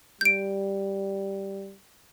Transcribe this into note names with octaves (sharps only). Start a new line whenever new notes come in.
G3 G6 D7